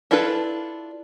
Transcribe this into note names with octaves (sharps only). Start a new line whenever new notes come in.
D4 E4 F4 A4 B4